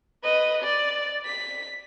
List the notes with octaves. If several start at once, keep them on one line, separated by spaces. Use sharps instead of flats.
B4 D#5
D5
B6